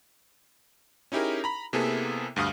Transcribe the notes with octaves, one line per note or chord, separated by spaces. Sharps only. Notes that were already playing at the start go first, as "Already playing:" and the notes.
C#4 D#4 E4 G4 G#4 A#4
A#5 B5
C3 A#3 B3 E4 G#4 A4
D2 G2 F5 D#6 F6